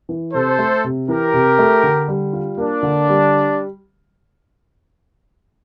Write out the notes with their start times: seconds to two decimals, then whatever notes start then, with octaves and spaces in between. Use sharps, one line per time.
0.09 E3
0.34 C3 A4 C5
0.59 A3
0.84 C3
1.08 E3 G4 A#4
1.34 C3
1.59 A3
1.83 D3
2.08 G3
2.33 F4
2.58 A#3 D4
2.83 D3
3.08 G3